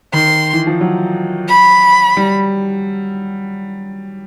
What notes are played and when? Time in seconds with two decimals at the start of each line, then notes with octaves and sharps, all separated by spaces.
0.13 D#3 C6
0.53 E3
0.67 F3
0.81 F#3
1.49 B5
2.17 G3